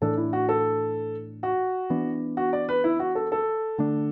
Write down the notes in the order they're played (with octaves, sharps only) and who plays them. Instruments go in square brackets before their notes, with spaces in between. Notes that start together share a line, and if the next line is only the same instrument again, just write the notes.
[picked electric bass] A2 E3 D4 [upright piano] A4
[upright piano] E4
F#4
A4
F#4
[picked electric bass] E3 B3 D4
[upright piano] F#4
D5
B4
E4
F#4
A4
A4
[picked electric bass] D3 A3 D4